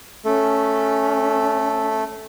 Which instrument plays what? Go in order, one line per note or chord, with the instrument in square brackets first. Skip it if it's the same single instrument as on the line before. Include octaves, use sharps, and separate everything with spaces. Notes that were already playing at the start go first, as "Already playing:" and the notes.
[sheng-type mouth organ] A3 A4 [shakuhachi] C#4